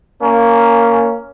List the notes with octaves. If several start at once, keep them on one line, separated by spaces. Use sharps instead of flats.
A#3 C#4